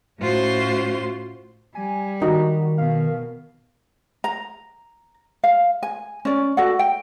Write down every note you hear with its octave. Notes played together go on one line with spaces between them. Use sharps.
A2 C#4 F4 F#4 C5 C6
G3 G#5
D#3 D#4 F#4
B2 F5
A#5
F5
G#5
C#4 D5
F#4 A4 D5 F#5
G5